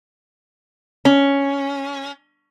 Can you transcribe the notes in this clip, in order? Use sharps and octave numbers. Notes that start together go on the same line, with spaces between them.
C#4